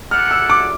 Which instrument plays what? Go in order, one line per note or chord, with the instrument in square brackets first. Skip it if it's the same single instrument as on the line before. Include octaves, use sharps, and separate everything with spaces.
[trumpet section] E4 A4 D5 F#5 [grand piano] F6
[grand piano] E6
D6